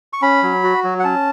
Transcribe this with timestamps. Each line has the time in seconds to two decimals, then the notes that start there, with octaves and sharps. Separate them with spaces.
0.13 C#6
0.22 C#4 B5
0.43 F#3
0.63 F#4
0.84 F#3
0.99 F#5
1.04 C#4 A5